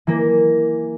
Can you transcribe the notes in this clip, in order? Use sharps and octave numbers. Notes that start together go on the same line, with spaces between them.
E3 A#3